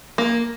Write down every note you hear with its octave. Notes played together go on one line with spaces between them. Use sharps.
A#3